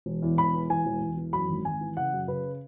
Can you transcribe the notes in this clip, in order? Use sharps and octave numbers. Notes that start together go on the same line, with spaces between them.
E1
E2
E1 B5
E3
E3 G#5
E1
E1
E3
F#2 B5
G#1
G#1 G#5
E3
C#3 F#5
F#2
C#3 B4